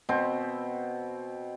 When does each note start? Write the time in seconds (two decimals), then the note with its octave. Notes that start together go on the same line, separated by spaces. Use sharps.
0.09 B2 C4